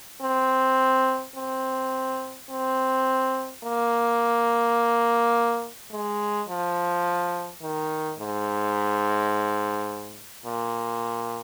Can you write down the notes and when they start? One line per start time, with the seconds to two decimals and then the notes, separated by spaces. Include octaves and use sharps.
0.22 C4
1.36 C4
2.50 C4
3.63 A#3
5.91 G#3
6.48 F3
7.62 D#3
8.19 G#2
10.45 A#2